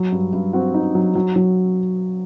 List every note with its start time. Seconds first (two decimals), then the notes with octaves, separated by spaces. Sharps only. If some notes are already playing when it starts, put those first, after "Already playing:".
Already playing: F#3
0.12 G2
0.33 G2
0.53 C4 F#4
0.74 D#4
0.95 F#3
1.15 F#3
1.36 F#3